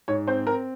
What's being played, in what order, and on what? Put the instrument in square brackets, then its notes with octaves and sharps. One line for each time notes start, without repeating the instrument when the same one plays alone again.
[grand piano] G#2 [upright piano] C#5
[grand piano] C4 [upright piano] C5
[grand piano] C4 [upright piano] A#4